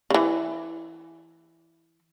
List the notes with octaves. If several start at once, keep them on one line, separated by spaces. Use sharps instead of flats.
C#3 E3